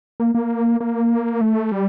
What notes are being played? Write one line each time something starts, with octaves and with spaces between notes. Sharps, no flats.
A#3
A#3
A#3
A3
G3